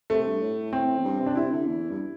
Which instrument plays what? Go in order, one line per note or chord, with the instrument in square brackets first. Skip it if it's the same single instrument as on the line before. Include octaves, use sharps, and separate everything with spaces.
[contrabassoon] C3 [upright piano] A3
[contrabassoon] G2
A2
[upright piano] C4
[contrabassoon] E2
G2
C3
[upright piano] D4
[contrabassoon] C3 [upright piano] E4
[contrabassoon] D3
E2
G2